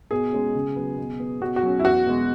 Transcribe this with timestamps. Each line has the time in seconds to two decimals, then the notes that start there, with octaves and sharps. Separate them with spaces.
0.11 B2 G#4
0.33 G#3 C#4
0.55 C#3
0.76 F#3 B3
0.97 B2
1.19 B3
1.41 B2 F#4
1.56 F#4
1.62 F#3 C#4
1.79 E4
1.85 E2 F#4
2.07 B2 G#3